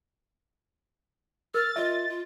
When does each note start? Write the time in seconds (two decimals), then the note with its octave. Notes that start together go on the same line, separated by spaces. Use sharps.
1.54 A#4 F6 A6
1.76 F4 D#5 E5
2.09 F4